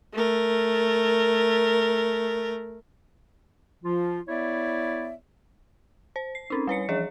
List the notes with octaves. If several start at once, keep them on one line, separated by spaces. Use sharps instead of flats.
A3 A#4
F3 F4
B3 E4 C#5 D5 E5
C5
C7
C4 C#4 D#4
G3 B4 C#5 C#7
E3 F3 G#4 C#5